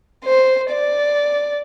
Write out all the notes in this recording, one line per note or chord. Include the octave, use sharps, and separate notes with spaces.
C5
D5